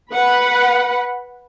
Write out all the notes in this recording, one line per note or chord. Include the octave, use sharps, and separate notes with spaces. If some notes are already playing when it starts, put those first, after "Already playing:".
B4 F#5 B5